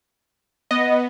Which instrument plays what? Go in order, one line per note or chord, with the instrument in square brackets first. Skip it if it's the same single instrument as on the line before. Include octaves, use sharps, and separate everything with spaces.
[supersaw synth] B3 [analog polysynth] D#5